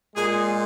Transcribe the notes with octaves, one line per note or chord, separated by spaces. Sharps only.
A#2 G#3 G#4